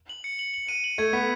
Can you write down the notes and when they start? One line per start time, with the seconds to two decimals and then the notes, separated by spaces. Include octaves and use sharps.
0.09 F#7
0.24 C#7
0.39 F#7
0.54 F#7
0.69 D#7
0.84 F#7
0.98 A3 G#6
1.13 B3 B6